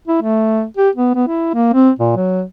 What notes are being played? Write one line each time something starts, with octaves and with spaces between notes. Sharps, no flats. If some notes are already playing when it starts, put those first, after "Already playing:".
E4
A3
G4
B3
B3
E4
A#3
C4
A#2
F#3